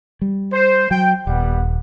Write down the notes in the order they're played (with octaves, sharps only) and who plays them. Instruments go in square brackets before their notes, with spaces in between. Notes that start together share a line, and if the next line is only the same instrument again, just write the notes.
[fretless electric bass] G3
[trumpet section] C5
[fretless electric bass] F#3 [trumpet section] G5
[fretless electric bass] D#1 [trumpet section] G3 B3 F#5